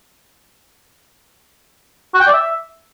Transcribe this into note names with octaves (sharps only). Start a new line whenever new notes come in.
F#4
G5
D5
E5